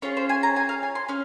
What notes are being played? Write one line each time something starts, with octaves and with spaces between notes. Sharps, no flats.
C#4 F4 G#4 C#5
C5
G#5
A#5
G#5
F5
G#5
C6
C#4 F6